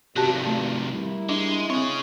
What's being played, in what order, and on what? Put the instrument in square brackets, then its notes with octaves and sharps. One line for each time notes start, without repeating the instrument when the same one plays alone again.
[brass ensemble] C#2 G2 [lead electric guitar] C3 D#3 [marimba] F#4 G4 A5
[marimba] A3
[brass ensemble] G3 A#3 E4
[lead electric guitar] G#3 [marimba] D4
[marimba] C4 [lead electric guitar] G#4 C#5